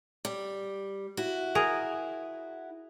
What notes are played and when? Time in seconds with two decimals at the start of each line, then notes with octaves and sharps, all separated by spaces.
0.25 G3
1.17 E4 F#4
1.55 G#4 A#4